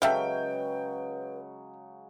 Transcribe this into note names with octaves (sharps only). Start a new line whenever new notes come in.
C#3 F#3 G#3 A4 B4 E5 F5 G5